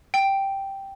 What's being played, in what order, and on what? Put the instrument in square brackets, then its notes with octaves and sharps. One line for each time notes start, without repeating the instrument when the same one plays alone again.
[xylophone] G5